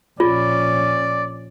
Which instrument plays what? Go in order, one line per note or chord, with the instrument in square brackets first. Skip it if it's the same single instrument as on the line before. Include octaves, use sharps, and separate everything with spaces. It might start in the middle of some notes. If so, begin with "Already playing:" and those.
[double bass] A#1 C#4 [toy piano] F4 [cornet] D5